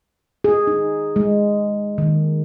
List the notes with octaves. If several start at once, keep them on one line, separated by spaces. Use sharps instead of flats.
G#4
D#4
G#3
D#3